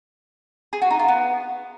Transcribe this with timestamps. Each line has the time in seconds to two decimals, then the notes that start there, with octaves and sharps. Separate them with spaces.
0.73 G#4
0.82 F#4
0.90 D#4
0.99 F4
1.08 B3